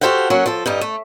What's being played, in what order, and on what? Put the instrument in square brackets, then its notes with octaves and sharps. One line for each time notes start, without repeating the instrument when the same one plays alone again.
[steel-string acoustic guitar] F#4 G4 A4 C5 F5 F#5
F#3 A#3 C#4 F#4
F3 A4
G2 G3 D#4
A3